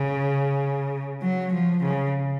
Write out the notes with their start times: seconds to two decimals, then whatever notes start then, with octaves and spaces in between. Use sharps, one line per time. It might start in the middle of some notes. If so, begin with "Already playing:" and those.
Already playing: C#3
1.22 F#3
1.53 F3
1.83 C#3